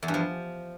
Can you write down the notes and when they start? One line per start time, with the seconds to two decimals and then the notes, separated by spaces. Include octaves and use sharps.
0.03 E2
0.08 G2
0.14 F3